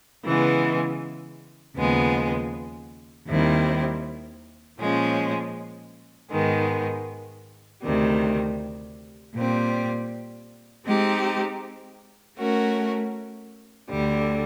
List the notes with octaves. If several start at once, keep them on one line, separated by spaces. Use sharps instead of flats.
C#3 E3 G#3 B3
D#2 C#3 F3 G#3 B3
D#2 D#3 G3 C4 E4
A#2 F3 G#3 C#4
G#2 D#3 G#3 B3
D2 C3 D#3 G3
A#2 G3 C4
G#3 C4 D#4 G4
A3 C#4 F#4 A#4
D2 D3 G3